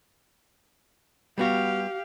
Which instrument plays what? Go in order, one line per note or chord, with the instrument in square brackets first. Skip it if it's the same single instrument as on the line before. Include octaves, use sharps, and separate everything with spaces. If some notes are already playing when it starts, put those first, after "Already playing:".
[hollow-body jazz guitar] G3 B3 F#4 [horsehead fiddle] G4 F5